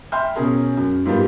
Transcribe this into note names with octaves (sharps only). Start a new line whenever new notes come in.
E5 G5 B5 C6 F6 G6
B2 C#4 G#4 A#4
F#2
G#2 G3 A#3 B3 F4 G4